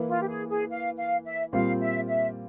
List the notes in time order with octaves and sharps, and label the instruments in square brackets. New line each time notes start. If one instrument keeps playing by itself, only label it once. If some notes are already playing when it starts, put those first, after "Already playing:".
Already playing: [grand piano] E3 A#3 E4
[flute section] F4
G4
G#4
G#4
F5
F5
E5
[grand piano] A#2 G3 C4 F4 [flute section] F5
[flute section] E5
E5